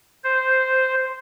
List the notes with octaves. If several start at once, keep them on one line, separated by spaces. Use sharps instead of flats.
C5